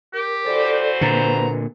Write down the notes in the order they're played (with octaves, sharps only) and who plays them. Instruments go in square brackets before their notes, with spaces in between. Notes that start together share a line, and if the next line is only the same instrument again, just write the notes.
[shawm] G4 [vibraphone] A#4
[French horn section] E3 F#4 C5 [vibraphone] A4 D5
[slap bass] A#2 D3 [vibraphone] A#3 B4 [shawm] A#5